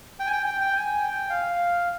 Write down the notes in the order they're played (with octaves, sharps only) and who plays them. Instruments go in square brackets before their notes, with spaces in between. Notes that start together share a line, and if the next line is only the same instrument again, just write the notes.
[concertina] G5
G#5
G5
G5
G5
G#5
G5
F5